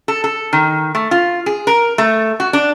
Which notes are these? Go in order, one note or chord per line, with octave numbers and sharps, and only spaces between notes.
A4
A4
D#3
A3
F4
G#4
A#4
A3
F#4
D4